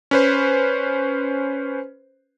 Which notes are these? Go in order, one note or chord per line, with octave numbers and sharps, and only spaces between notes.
C#4 B4 C5